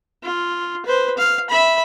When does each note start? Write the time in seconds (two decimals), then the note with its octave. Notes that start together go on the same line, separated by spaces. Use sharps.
0.24 F4
0.86 B4 C5
1.18 F5
1.50 E5 B5